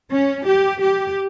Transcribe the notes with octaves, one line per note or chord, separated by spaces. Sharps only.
C#4
G4
G4